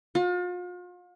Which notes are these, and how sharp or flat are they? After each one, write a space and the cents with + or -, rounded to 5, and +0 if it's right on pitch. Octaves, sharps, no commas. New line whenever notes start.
F4 +40